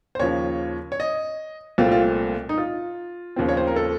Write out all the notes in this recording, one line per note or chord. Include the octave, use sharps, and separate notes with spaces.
C5
D#2 C#3 F3 C#5
C#5
D#5
C2 A#2 A3 C4 F4
F4
D#4
F4
D#2 C#3 F3 C4
C#5
C5
A#4
A4